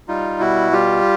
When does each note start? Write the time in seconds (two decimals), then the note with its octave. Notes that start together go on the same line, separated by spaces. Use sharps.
0.08 G3 D#4 F4
0.40 B2 E4 F#4
0.72 G3 F4 G4